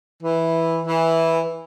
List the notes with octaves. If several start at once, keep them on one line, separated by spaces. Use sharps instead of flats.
E3
E3